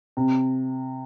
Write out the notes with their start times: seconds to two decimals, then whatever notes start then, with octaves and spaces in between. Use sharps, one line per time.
0.17 C3